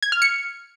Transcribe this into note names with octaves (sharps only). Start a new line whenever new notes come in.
G#6
F6
C#7